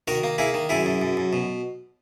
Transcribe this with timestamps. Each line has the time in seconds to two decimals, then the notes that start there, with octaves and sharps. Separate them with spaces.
0.08 D#3 F#4 A#4
0.23 A#3
0.38 A#3 E4 G#4
0.54 D#3
0.69 F#2 E4 G#4
0.86 F#2
1.02 F#2
1.17 F#2
1.33 B2